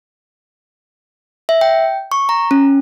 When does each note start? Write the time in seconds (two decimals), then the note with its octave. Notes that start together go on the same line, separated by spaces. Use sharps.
1.49 E5
1.61 G5
2.12 C#6
2.29 A#5
2.51 C#4